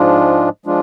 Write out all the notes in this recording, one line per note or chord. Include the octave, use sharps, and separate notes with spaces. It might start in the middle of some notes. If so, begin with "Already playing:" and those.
Already playing: G#2 F3 G#3 D4 F4
F3 G#3 D4 F4